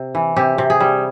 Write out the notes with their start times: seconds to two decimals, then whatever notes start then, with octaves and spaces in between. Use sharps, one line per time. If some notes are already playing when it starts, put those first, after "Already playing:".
Already playing: C3
0.15 E3
0.36 C3 G4
0.58 C3
0.70 G#4
0.80 G3